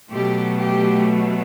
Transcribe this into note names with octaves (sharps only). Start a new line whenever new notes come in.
B2 F#3 A3 G4
G4